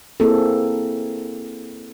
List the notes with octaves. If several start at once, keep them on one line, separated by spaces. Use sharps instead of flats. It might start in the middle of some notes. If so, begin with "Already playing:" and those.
A#3 C4 E4 G#4 A4